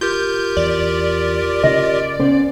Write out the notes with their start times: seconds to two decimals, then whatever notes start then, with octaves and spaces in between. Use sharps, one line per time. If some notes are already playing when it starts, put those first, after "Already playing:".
0.01 F4 G4 A#4 G6
0.57 E2 D5
1.64 C#3 D#5
2.19 B3 C#4 C5